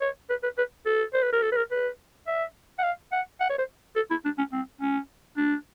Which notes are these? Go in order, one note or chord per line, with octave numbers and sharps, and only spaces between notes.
C#5
B4
B4
B4
A4
C5
B4
A#4
A4
B4
A#4
B4
E5
F#5
F5
F#5
F#5
C#5
C5
A4
E4
D4
C#4
C4
C#4
D4